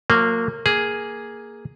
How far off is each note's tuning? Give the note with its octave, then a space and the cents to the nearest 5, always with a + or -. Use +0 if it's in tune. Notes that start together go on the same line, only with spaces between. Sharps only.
F#3 -45 A#3 -20
A#3 +0 G#4 +0